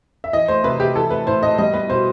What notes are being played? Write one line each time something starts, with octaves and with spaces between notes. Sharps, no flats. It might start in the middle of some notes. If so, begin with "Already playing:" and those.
E5
E3 D#5
A3 C5
C3 B4
C3 G4
E3 A4
A3 B4
A2 C5
A2 D#5
G3 D#5
B3 B4
B2 C5